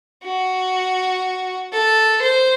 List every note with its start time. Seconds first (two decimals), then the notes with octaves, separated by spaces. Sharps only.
0.23 F#4
1.72 A4
2.22 C5